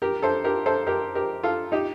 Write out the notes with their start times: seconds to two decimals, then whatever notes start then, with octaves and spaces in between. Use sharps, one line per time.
0.02 G4 A#4
0.22 A4 C5
0.44 G4 A#4
0.66 A4 C5
0.87 G4 A#4
1.15 G4 A#4
1.43 F4 A4
1.72 D#4 G4